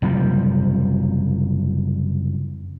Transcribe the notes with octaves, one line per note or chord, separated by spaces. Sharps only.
F#1 C3 F3 G3